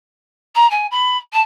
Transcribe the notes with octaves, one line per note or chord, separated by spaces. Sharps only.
A#5
G#5
B5
A5